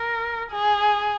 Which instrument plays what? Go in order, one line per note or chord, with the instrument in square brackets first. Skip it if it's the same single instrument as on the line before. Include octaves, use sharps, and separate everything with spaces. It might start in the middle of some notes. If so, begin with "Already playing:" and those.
Already playing: [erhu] A#4
G#4